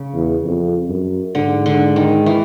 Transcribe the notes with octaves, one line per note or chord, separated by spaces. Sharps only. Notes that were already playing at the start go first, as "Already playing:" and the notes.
Already playing: C#3
E2
F2
F#2
G#2 D3
D3
D#3
E3